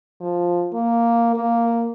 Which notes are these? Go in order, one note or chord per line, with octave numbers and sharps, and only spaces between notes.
F3
A#3
A#3